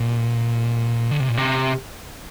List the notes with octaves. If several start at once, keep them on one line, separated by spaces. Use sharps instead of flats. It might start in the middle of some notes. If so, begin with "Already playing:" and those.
Already playing: A#2
D3
C3
A#2
C3